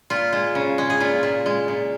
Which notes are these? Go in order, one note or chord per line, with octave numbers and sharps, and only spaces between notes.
A#2 F4
G#3
C#3
G#3
G#4
A#2 F4
A#2
G#3
A#2